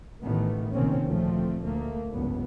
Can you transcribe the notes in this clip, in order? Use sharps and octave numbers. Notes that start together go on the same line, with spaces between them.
A1 A2 D#3 E3 A3 B3
A#1 C3 D#3 A#3 C4 C#4
D2 A#2 F3 A3 C4
D2 A3 A#3
F1 C#2 G2 B3